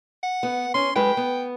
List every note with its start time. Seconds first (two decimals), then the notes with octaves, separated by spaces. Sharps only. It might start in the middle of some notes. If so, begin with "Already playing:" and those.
0.23 F#5
0.43 B3
0.74 C#4 C6
0.96 F#2 G#3 B4 G5
1.17 B3